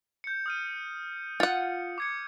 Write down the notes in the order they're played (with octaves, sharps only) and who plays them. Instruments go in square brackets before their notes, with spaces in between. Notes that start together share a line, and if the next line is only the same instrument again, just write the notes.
[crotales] G6 C#7
D#6 F6 D#7
[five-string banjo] F4 F#5 [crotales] C#7
[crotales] D6 G#6 C#7